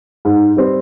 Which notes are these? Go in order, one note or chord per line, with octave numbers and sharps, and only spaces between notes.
G#2
G3 C4